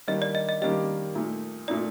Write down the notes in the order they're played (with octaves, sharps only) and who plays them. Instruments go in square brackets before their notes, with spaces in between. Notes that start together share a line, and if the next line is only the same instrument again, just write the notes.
[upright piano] D#3 G3 A#3 D4 G4 [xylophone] D#5
[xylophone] D5
D#5
D#5
[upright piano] D#3 G3 A#3 D4 G4 [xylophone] D#5
[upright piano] A#2 A3 D#4
[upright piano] A#2 A3 D#4 [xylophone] D5